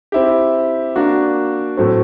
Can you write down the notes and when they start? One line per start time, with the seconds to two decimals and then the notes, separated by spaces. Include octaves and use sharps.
0.12 C4 E4 G4
0.96 A#3 D4 F#4
1.77 A2 F#3 A3 C4